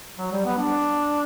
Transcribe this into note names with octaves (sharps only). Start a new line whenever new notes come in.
F#3
G3
B3
D4